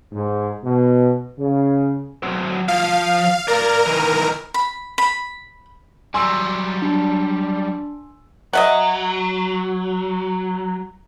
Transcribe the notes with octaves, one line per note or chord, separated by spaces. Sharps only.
G#2
B2
C#3
F#3 C4
F3 F5
A#4 D5 F5
D#3 E3
B5
B5
F#3 G3 G#5 C6 E6
D4
F#3 D#5 E5 F#5